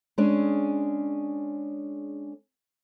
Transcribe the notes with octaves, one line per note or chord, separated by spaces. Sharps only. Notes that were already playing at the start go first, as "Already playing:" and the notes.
G#3 C#4 D4 G#4